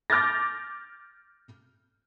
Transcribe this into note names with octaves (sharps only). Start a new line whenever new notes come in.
D6 F6 G6 A6 A#6